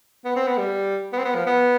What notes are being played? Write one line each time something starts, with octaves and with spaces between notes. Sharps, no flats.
B3
C4
B3
G3
B3
C4
B3
F3
B3